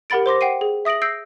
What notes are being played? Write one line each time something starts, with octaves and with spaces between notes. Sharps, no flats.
G4 A#4 F#5 B5 A6 D7
C5 C6 D6 A#6
F#5 G5 C7 D#7
G#4
E5 D#6 A#6 D7 F#7
E6 G6 A#6 C7 D7